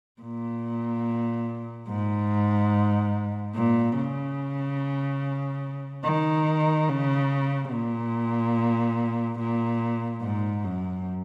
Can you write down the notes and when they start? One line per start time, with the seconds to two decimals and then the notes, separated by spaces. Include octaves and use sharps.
0.21 A#2
1.88 G#2
3.54 A#2
3.96 C#3
6.04 D#3
6.89 C#3
7.72 A#2
9.39 A#2
10.21 G#2
10.63 F#2